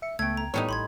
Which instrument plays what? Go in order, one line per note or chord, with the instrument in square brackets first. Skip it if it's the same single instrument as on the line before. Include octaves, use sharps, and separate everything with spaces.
[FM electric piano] E5 C#7
[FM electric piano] C#2 B3 [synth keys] A3 [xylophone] G5 G#6
[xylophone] A#5
[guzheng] A2 G3 D#4 [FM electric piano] B3 [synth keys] C#5
[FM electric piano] A1 [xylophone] B5 C6 G#6